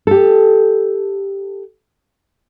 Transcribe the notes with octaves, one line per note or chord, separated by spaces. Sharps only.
G4 A4